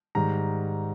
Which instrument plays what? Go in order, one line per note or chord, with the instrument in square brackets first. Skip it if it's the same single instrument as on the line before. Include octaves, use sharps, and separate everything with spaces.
[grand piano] G#2 D#3 G3 A#5